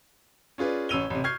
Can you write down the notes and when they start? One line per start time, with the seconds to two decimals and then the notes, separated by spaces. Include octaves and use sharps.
0.58 C#4 F4 G#4 B4 D5
0.89 A1 C#4 E6 D#7 F7 G7
1.10 A1 C3
1.24 C#6 F6 G6 G#6 C7